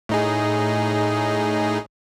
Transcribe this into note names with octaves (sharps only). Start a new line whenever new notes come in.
A2 D#4 G#4